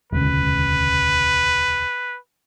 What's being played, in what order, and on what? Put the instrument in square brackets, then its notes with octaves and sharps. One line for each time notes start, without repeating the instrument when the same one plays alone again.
[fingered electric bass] E1 D2 C#3 [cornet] B4